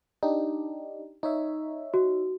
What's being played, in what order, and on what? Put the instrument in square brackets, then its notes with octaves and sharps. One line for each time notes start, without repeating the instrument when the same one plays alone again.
[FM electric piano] D4 D#4 G4
D#4 C#5 E5
[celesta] F#4